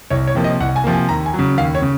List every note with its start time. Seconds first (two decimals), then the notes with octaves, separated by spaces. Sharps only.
0.10 C2 C#5
0.27 C#5
0.35 C3 F3 A#3
0.44 D#5
0.60 C2 F#5
0.76 G#5
0.84 C3 F3 A#3
0.93 G#5
1.09 D#2 A#5
1.26 G#5
1.34 C#3 F#3
1.58 D#2 F5
1.75 C#5
1.82 C#3